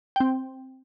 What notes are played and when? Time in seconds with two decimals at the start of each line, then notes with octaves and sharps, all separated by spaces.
0.16 C4 G5